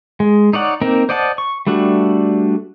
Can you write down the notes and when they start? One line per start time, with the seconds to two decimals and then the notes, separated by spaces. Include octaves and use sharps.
0.20 G#3
0.53 D#4 C#5 D5 F#5
0.82 A#3 C4 D#4 A#4
1.09 C5 D5 D#5 F#5 A5
1.38 C#6
1.67 G3 A3 D4 F#4